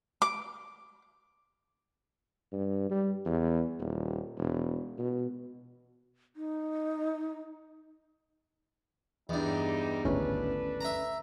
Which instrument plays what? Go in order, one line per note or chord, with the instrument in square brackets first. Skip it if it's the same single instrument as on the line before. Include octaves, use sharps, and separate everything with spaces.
[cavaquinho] D6
[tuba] G2
G3
E2
D#1
E1
B2
[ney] D#4
[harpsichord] E2 G2 [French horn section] G3 D#4
[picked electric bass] G#1 D2 A2 [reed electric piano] C#4 [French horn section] D4 A4 B4
[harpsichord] E5 A#5